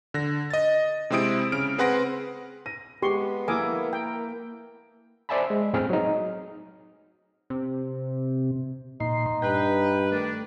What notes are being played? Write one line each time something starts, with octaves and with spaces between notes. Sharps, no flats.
D3 A#6
D#5 A6
C3 G#3 C4 E4 D#6 D7
C#3 F6 D7
C4 G#4 B4 F#5 C6 A#6
A#6 D#7
G#3 B3 G4 C6 C#6
A#3 E4 A4 G#5 D6 D#6
A#4 G5
C5 D5 E5 G#5 A5 B5
G#3
A2 C4 G#4 F6
F#3 D#4
C3
A#2 D#4 C6
G2 B4 G5
D#3 A3 D4